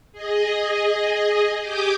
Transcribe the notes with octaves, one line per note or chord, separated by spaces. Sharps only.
G#4 D#5
G4 G5 G#5 D6 D#6 G6